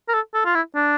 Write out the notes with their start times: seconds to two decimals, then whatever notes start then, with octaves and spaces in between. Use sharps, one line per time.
0.09 A#4
0.14 A4
0.34 A4
0.45 F4
0.55 E4
0.75 D4